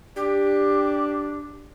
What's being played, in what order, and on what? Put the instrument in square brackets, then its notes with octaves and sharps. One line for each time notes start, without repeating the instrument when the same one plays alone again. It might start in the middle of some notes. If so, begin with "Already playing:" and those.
[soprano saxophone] D4 [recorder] G4